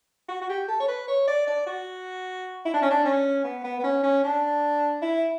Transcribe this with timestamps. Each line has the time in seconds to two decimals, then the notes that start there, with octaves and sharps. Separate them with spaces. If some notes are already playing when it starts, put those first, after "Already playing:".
0.28 F#4
0.41 F#4
0.49 G4
0.68 A4
0.80 C#5
0.88 B4
1.08 C#5
1.28 D5
1.47 D5
1.66 F#4
2.65 E4
2.74 D4
2.82 C#4
2.90 D4
3.04 C#4
3.44 B3
3.64 B3
3.79 B3
3.84 C#4
4.03 C#4
4.23 D4
5.02 E4